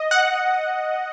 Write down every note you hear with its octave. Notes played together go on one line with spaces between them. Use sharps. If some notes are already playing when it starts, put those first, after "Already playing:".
Already playing: D#5
F#5